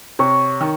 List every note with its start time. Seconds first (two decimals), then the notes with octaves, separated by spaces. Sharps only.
0.19 C3 C#5
0.60 D#3